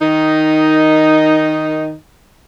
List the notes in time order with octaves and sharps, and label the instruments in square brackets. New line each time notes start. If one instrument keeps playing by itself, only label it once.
[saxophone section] D#3 D#4